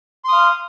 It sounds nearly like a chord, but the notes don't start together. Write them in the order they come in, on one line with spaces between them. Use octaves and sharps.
C6 D#6 F5